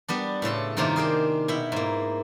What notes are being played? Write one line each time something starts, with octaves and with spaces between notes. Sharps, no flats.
G3 B3 D4
A2 C#3 A4 C6
G2 C3 D#3 A#3 D4 F4
G#4 A#4 C5 G5
B2 E4 G5
G#2 A#3